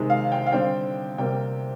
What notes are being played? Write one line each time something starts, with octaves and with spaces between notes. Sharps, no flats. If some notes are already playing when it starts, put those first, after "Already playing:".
Already playing: C3 D#3 G#3
F5
G5
F5
D3 G3 C4 G5
C3 G3 A#3 G5